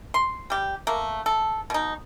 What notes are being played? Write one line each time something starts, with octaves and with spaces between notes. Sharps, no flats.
C6
G3 G4
A3 A#3
A4
B2 D#4